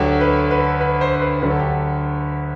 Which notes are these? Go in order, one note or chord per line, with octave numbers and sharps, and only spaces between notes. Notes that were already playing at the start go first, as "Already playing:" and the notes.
Already playing: D2 D3 F#3 G4
B4
B4
A4
B4
C5
C5
B4
D2 D3 F#3 B4
A4
G4
A4